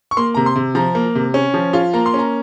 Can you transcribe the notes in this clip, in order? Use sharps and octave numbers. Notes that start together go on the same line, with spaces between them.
C#6
A#3 C6
C3 A#5
C6
C3
F3 A#5
A#3
C3
C#4
F3
F4
A#3 A#5
C6
C#4 A#5